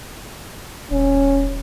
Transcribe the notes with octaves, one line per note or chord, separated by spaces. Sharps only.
D#1 C#4